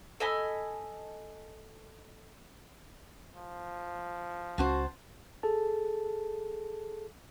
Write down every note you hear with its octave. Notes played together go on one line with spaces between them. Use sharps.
A4 D#5 G#5 B5
F3
C#2 C#4 F#4 C5 F#5 A5
G#4 A4 A5